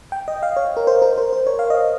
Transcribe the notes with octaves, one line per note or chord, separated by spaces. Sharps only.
G5
D#5
F5
C#5
A#4
C5
A#4
C5
C5
C#5
F5
D#5